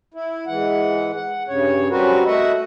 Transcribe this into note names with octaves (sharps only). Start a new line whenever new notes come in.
E4
G#2 E3 F#5
F#5
G2 C#3 C#5
G3 C4 C#4 F#4 A#4 B4
A3 F#4 D#5 E5 F#5